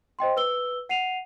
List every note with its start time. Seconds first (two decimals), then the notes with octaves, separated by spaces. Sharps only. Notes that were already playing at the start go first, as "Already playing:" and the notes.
0.19 C5 D#5 G5 C6
0.37 B4 E6 G7
0.89 F#5 C7 D#7 F7